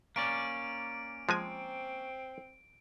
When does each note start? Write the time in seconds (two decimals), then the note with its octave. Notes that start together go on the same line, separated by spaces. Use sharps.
0.16 A#3 C#4 D5 D7
1.29 F3 G#3 C4 G#5